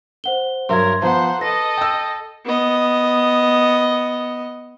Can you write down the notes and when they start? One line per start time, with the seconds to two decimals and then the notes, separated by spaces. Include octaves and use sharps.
0.24 C5 F#5 G7
0.69 G2 F#3 A#4 E5 C6 G#6
1.02 F3 B3 C5 F#5 A#5 C6
1.41 A4 B4 D#5 A#6
1.78 G5 E6
2.45 B3 D#5